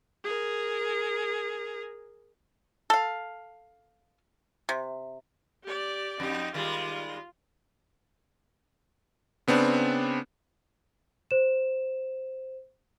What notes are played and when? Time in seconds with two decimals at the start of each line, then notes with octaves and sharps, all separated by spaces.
0.24 G#4 A#4
2.90 A4 F5
4.69 C3
5.64 G4 D5
6.20 F2 D#4 G4
6.54 D#3 G3 G#3 F4
9.48 C#3 B3 C4 D4
11.31 C5 E7